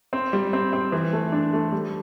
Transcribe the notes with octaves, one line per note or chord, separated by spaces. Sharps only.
C4
G3
C4
C4
E3
A3
D4
A3
G3